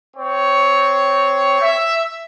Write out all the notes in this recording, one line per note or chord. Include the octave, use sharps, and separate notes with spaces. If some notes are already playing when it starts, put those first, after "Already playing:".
C4 C#5
E5